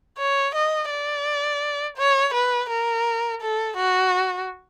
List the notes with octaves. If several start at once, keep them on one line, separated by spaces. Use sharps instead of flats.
C#5
D#5
D5
C#5
B4
A#4
A4
F#4